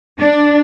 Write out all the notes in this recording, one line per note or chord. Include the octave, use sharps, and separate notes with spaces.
D4